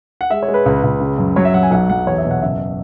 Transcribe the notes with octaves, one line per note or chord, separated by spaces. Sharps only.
F#5
G#3 E5
C#5
G#3
B4
C#2
C#2
C#3
F#2
F#3 C#5
E5
F#3 F#5
G#5
B1 F#5
F#3 F#5
E2 C#5
E5
B2
F#5
F#1 E5